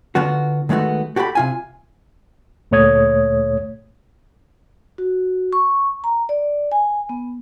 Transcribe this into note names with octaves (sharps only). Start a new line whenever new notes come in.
D3 B3 F4 F#4
D#3 G#3 A3 B3 F#4
F#4 G4 A4 C5 B5
C3 F4 G#5
D2 A#2 A3 C#5 D#6 G#6
F#4
C#6
A#5
D5
G#5
B3